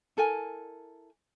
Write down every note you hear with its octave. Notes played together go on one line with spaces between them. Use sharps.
E4 A4 A#4 G#5